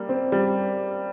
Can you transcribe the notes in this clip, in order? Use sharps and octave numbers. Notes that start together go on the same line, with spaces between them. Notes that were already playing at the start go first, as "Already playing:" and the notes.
Already playing: G3 A#3
C4
G3